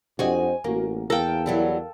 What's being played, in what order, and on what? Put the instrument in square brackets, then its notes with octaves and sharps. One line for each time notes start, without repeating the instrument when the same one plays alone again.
[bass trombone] F2 [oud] C4 F#4 [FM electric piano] D4 G4 D#5 [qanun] G#5
[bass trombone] A1 [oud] A#3 [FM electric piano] F#4 A#4
[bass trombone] E2 [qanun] A4 G5 [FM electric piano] A#4 F5
[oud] F#3 G3 E4